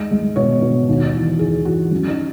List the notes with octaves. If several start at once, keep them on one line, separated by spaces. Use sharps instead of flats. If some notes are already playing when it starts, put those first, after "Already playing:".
Already playing: D#2 G#3
G#3
B2 C#5
B2
D#2
E3
D#2 G#4
E3 F#4
F#3 C#4
D#4